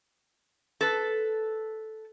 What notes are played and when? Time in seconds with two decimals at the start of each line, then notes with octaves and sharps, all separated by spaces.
0.81 A4 B4